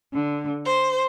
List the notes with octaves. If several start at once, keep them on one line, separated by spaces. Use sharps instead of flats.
D3
C5